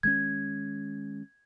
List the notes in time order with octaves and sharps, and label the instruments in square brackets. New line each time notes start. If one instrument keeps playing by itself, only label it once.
[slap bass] D#3 G#3 C#4 [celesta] G#6